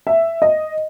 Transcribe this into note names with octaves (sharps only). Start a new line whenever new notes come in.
E5
D#5